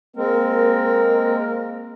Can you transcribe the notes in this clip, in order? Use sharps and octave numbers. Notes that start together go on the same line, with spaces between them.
G#3 A#3 C4 A#4